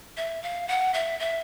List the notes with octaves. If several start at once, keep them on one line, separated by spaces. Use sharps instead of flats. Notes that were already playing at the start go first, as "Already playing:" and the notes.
E5
F5
F#5
E5
E5